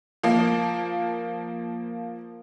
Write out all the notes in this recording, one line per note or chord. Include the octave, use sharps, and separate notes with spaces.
F3 A#3